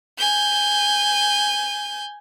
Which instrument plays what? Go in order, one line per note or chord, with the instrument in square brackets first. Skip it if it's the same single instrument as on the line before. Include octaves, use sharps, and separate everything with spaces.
[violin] G#5 G6